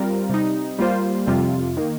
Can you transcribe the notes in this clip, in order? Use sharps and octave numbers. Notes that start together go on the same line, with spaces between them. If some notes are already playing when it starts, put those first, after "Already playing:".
Already playing: G3 C4 F4 A#4
C3 G3 D#4
G3 A#3 F4 C5
F2 C3 G3 C4 F4
D#3 A#3